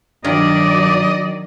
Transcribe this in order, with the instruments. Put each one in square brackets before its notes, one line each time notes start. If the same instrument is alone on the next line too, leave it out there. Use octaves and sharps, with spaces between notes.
[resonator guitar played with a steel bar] G2 [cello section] D#3 F#3 [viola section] D5 [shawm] D#5